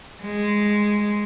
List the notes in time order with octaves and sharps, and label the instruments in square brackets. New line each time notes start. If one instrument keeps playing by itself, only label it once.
[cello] G#3